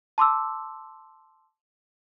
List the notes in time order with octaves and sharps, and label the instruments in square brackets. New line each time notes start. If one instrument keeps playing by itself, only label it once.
[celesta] A5 C6 D6 E6